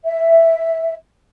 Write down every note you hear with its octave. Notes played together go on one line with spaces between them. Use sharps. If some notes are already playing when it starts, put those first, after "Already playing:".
E5